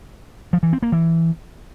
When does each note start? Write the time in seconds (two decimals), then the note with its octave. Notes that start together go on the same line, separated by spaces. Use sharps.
0.53 F3
0.63 E3
0.73 C4
0.83 A#3
0.92 E3